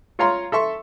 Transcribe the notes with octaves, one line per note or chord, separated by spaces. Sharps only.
F4 C#5 F5 A#5 C6
A4 E5 C6 C#6